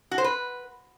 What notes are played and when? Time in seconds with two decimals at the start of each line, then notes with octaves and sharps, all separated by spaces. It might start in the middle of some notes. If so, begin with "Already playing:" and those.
0.11 F#4
0.18 C5
0.24 B4